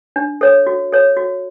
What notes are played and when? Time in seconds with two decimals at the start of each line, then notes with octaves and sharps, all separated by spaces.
0.16 D4
0.41 A4 C#5
0.67 F#4
0.92 A4 C#5
1.17 F#4